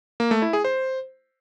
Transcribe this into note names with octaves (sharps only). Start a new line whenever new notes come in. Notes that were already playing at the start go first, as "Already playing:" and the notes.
A#3
A3
E4
G#4
C5